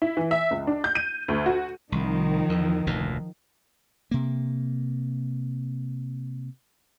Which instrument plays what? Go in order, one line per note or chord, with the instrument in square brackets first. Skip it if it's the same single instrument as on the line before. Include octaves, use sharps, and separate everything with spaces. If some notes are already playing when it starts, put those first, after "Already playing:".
[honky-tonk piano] E4
E3
E5
C#2
D4
G6
D#7
D2
F#4
[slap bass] C2 [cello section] D#3 F3
[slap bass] E2
F1 D2 A#2
C3 A#3